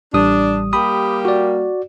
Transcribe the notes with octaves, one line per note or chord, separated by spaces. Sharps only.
A1 G3 D4 D#6
G3 A#3 G4 B5 D#6
F#4 D5